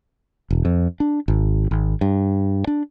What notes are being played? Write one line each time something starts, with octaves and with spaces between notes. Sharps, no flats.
E1
F2
D4
G#1
G#1
G2
D4